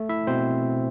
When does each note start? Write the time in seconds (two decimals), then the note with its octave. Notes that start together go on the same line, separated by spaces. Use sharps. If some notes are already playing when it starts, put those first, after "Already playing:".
Already playing: A3
0.09 E4 E5
0.27 B2 C4 C5